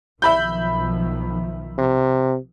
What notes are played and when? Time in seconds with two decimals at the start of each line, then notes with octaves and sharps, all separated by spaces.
0.22 B1 D#3 F3 E5 B5 G6
1.78 C3